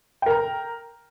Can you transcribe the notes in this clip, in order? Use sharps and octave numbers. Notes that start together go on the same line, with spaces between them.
A#4 G5 A#5